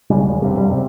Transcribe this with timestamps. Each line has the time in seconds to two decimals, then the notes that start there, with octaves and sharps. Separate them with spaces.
0.10 B1 C#3 G3 G#3
0.28 D#2
0.42 E1 G2 C3
0.57 F#2 G3
0.71 C3 C4